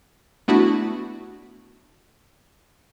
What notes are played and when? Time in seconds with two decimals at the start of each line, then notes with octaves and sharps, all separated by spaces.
0.48 A3 B3 D4 E4 F#4